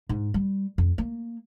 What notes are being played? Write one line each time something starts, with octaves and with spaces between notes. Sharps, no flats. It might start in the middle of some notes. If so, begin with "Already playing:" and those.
G#2
G3
F2
A#3